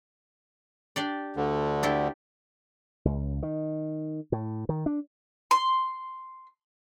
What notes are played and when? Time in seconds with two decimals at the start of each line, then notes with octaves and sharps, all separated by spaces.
0.96 D4 G4 D5
1.36 D2 D3
1.83 D4 E4 G4
3.05 C#2
3.43 D#3
4.32 A2
4.69 D#3
4.86 D4
5.51 C6